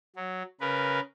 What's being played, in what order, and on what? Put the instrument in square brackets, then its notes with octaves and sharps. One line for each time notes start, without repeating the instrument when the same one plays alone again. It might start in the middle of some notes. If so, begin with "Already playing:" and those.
[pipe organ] F#3
C#3 A#4 B4